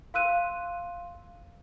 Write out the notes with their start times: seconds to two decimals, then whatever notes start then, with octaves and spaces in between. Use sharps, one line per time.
0.14 F5 C6 E6 F#6 D#7